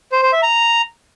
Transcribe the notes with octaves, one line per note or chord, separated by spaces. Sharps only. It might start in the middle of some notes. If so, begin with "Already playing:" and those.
C5
C5
E5
A#5